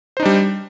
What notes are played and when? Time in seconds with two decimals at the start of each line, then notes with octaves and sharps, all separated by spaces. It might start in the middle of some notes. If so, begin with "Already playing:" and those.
0.17 C5
0.20 D#4
0.23 D4
0.25 G3